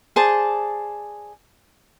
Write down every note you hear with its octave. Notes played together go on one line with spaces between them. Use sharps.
G#4 C5 D5 A5